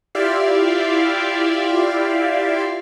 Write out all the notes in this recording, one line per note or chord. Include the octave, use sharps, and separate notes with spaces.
E4 F4 G4 D5 E5 F5